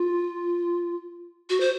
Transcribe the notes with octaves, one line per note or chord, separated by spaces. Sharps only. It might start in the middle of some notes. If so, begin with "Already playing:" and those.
Already playing: F4
F#4
C5